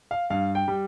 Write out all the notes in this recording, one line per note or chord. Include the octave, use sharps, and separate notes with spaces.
F5
G2 F5
G5
G3